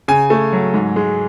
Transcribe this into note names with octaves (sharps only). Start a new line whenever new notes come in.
C#3 G#5
A3
F#3
G#2
G#3